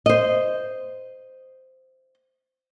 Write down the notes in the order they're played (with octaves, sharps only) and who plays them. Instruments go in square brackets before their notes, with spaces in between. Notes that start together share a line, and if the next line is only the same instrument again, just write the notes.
[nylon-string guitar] C5 D#5